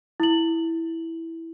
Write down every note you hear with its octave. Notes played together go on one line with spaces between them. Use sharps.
E4 F#7